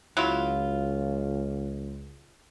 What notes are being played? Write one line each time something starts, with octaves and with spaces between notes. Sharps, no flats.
C#2 F#3 E4 F4